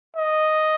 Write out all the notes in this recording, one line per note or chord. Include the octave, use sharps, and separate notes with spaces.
D#5